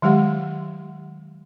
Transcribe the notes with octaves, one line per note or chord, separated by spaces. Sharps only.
D#3 F#3 G#3 G4 F#5